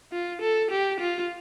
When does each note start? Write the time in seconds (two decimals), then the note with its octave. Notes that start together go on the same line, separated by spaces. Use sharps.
0.12 F4
0.42 A4
0.71 G4
1.00 F4